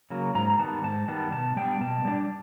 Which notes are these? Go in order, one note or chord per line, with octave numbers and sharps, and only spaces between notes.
C#3 F#3 A#3
G#2 A#5
A#5
D#3 G3 B3 A5
G#2 A5
D#3 G3 B3 A5
B2 A5
G3 B3 D4 G5
B2 A5
G3 B3 D4